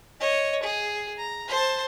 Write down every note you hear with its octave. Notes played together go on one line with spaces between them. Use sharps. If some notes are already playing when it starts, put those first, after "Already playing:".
C#5 D#5
G#4
A#5
C5 A5